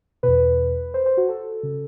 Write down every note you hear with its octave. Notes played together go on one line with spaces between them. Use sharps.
E2 B2 B4
C5
C5
F#4
A4
C#3